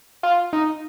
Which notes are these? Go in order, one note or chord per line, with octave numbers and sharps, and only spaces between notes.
F4
D#4